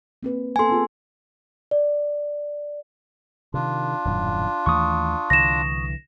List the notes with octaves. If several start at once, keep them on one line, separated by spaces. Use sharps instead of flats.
A#3 C4 B4
A#3 B3 A4 G#5 C6
C4 F4 G#4
D5
C3 D#3 D4 F4
D#1 F#2 A2
D#2 E3 A3 C#6 D#6
C2 D3 E3 A#6 E7